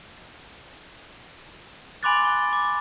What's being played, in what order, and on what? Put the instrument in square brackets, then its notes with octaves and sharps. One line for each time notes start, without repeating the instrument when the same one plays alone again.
[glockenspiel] G#5 B5 C6 D6 F#6 A6
G7
D6